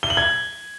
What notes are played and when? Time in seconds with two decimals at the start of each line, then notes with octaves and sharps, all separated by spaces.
0.03 G7
0.10 F#7
0.17 G#6